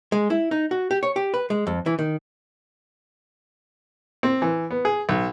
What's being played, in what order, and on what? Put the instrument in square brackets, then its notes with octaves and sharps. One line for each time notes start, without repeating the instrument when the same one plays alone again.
[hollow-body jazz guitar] G#3
E4
D#4
F#4
G4
C#5
G4
B4
G#3
F2
E3
D#3
[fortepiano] C4
E3
B3
G#4
B1